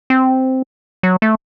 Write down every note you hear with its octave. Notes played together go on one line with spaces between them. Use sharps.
C4
F#3
A3